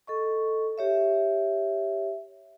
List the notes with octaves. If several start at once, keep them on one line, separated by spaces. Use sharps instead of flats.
A4 D#5 C#6
G4 C#5 E5